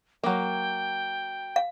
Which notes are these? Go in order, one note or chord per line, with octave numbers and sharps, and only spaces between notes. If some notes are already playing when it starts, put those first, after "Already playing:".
F#3 A#3 G5
F5